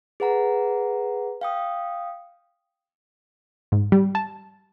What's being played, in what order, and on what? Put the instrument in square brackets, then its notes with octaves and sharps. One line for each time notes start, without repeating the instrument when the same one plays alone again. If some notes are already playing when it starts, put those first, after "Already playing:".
[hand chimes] G#4 B4 F#5 A#5
F5 G5 D#6
[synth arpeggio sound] G#2
G3
A5